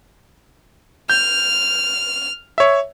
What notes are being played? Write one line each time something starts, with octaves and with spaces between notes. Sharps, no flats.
F6 G6
C#5 E5